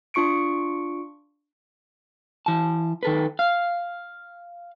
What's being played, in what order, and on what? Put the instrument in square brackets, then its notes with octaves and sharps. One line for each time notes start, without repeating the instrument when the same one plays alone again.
[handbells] D4 F4 C#6 C#7 D7
[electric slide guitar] E3 A5
D#3 A4 B4
F5